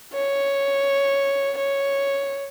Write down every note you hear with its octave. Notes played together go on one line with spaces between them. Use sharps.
C#5
C#5